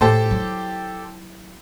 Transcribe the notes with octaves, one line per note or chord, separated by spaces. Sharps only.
A2 G4 A4 C5
F#3 E4